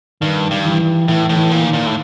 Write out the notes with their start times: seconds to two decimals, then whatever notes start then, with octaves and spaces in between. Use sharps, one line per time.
0.21 G2 D#3
0.51 G2
0.65 E3
1.08 A2 E3
1.29 A2
1.37 E3
1.51 A#2
1.66 D#3
1.73 A#2
1.86 A2